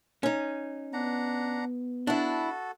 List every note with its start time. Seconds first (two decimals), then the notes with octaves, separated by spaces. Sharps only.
0.23 C#4 D#4
0.93 B3 D4 F#5 A#5
2.07 D4 E4 F#4 A4